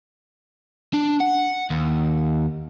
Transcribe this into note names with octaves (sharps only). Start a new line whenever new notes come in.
D4
F#5
D#2